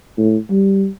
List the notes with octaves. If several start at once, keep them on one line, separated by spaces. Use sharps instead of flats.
A2
G3